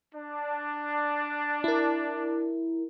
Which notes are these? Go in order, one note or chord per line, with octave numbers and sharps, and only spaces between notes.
D4
E4 A#4